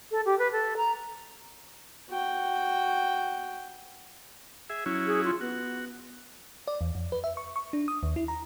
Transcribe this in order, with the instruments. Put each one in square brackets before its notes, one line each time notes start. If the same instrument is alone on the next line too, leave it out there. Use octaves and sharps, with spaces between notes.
[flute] A4
G4
B4
A4
A#5
[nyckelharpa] F#4 G5
[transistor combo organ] G#4 E5
F#3 C#4 E4
[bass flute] G#4
F4
[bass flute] B3 [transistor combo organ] F#4
[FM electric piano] D5
E2
F2
B4
E5
C#6
C#6
D4
D#6
D#2
E4
A#5